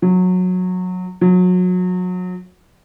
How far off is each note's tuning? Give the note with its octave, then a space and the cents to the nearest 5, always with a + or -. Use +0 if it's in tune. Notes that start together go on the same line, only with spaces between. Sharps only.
F#3 -20
F#3 -30